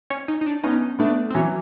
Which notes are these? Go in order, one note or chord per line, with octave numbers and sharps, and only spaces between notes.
C#4
D#4
D#4
D4
B3 C#4 D#4
A3 B3 D4
C4
E3 F#3 C#4